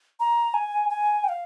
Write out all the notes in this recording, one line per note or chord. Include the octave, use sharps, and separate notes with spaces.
A#5
G#5
G#5
G5
F5